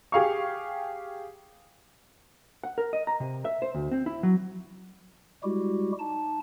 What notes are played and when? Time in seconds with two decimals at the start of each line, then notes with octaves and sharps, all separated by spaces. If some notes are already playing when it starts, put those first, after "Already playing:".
0.12 G4 G#4 F5 C#6
2.64 F#5
2.78 A#4
2.93 D#5
3.07 A#5
3.20 C3
3.45 E5
3.62 C5
3.75 D2
3.91 C4
4.06 E4
4.23 F#3
5.43 G3 G#3 E4 F#4 G4
5.99 D#4 A5